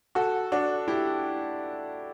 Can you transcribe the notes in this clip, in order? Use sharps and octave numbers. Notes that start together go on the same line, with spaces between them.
F#4 A4
D4 F#4
E4 G4